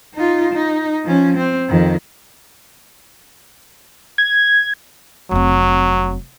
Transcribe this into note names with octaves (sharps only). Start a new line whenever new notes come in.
D#4 F4
D#4
F3 C#4
C4
F2 D#3
G#6
F1 F#3 C4